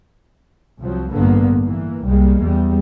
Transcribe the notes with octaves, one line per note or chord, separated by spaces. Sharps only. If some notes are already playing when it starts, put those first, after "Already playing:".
C2 F3 F#3
A1 G2 A#2 D3 A#3 B3
E3 A#3
C2 G3 G#3 A#3
E2 G3